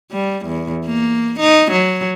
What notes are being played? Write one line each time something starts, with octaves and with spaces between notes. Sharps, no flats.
G3
E2
A#3
D#4
F#3